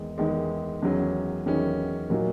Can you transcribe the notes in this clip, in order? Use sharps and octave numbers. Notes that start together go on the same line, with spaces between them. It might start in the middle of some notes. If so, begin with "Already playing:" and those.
Already playing: E2 D#3 G#3
E2 D#3 G#3
E2 D#3 F#3 C#4
E2 D#3 F#3 C#4
A#2 F#3 A#3 D#4 F#4